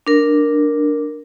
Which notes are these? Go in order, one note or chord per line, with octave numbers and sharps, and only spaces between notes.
D4 A#4